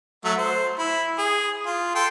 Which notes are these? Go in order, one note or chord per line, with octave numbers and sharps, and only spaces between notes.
F#3 A3 E5
C5
E4
G#4
F4
A4 G5 C6